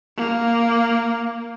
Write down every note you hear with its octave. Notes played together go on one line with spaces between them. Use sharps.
A#3